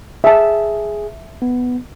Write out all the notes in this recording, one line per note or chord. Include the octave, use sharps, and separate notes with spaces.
G#4 E5 A5
B3